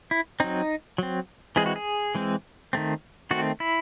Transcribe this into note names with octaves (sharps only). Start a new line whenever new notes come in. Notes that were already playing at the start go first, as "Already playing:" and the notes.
E4
F#3 C4 D#4
F#3 C4
E3 G#3 C4 G#4
F#4
G#4
E3 G#3 C4
D#3 A3 C4
D#3 A3 C4 F#4
E4